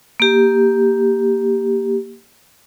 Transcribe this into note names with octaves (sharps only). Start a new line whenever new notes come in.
A#3 G4